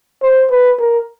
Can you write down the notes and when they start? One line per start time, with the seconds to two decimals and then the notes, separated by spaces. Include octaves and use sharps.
0.22 C5
0.50 B4
0.79 A#4